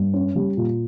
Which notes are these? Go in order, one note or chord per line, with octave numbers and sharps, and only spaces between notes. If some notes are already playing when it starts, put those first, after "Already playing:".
Already playing: G2
C#4
G3
A#2